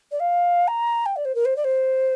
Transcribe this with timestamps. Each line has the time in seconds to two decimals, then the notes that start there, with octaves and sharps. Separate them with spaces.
0.11 D5
0.20 F5
0.67 A#5
1.06 G5
1.16 D5
1.25 C5
1.35 A#4
1.45 C5
1.56 D5
1.64 C5